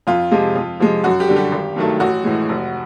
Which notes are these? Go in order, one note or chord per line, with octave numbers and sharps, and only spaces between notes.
F2 F4
C3 F3 G#3
F2
C3 F3 G#3
F#2 F#4
G4
D3 G3
G4
G#1
G2 D#3 F#3 A3
A1 F#4
A2 E3 G#3
F1